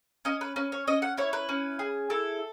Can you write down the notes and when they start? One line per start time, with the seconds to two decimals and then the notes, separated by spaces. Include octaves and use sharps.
0.25 C#4 D#5
0.41 B4
0.56 C#4 B4
0.72 C#5
0.87 C#4 D#5
1.02 F#5
1.17 E4 C#5
1.33 B4
1.49 C#4
1.79 G#4
2.10 E4 A4